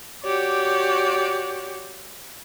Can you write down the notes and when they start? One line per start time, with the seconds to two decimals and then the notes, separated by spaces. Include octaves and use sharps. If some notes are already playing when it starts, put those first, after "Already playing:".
0.23 F#4 G4 C#5 D5